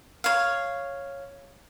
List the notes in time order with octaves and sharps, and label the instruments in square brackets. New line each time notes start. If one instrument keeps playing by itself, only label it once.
[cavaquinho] C#5 F5